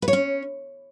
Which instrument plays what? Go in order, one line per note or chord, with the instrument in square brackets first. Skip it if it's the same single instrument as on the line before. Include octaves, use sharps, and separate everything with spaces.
[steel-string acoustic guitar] B4
C#5
C#4